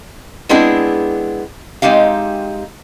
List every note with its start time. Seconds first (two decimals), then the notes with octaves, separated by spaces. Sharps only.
0.49 G#3 B3 C4 D4 E4 G#4
1.82 G#3 C4 D#4 G4 F5